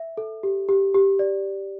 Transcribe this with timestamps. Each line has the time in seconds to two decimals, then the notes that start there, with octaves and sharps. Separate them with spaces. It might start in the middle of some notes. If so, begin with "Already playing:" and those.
Already playing: E5
0.17 A4
0.43 G4
0.69 G4
0.95 G4
1.19 D5